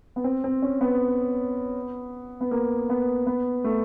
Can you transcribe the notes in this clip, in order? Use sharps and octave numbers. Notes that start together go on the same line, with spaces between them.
B3
C4
C4
C#4
B3
B3
A#3
B3
B3
A3